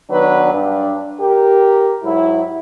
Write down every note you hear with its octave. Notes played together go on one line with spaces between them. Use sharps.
D#3 F#3 B3 D4 B4
G2 D4
G4 A#4
G#2 F#3 E4